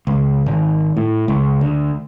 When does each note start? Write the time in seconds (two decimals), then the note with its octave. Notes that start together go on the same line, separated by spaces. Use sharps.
0.07 C#2
0.46 G#1
0.97 A2
1.28 C#2
1.61 D2